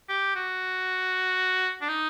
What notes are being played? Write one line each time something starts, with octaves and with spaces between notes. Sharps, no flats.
G4
F#4
D4
D#4